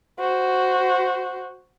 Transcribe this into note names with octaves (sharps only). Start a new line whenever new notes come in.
F#4 C5